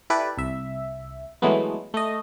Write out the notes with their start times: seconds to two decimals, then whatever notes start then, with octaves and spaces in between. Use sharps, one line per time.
0.10 E4 G4 A4 B4 D5
0.37 C2 E5
1.42 E3 F#3 G#3 A3 B3
1.94 A3 D#5